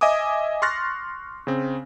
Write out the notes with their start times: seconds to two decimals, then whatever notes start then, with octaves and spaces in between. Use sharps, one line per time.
0.01 D#5 E5 G#5 D6 D#6
0.62 C6 C#6 F6 F#6 A6 A#6
1.47 C#3 C4